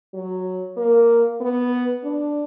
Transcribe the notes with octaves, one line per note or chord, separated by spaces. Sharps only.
F#3
A#3
B3
D4